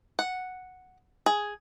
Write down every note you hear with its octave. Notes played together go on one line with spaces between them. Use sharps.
F#5
G#4